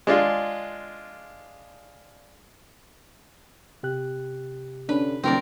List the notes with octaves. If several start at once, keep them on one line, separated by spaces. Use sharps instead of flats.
G#3 D4 F4
C3 G4 F#6
D3 C#4 D4 B4
D#1 C#3 F#3 C4 C#4 A#4 D5